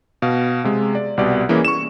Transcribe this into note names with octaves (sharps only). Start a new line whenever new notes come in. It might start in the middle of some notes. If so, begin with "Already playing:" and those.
B2 F5
C3 G#3
D5
C2 B2 G4 D5
E3 A#3 C#4 E4 G#4
C#6 E7